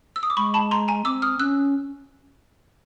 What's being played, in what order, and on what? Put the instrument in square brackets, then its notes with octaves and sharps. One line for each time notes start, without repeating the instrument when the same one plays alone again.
[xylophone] E6
D#6
D6
[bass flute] G#3 [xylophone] B5 C#6
[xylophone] A5 B5
A#5 C6
G#5 A#5
[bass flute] C4 [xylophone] D6 E6
[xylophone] D#6 F6
[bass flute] C#4 [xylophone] E6 F#6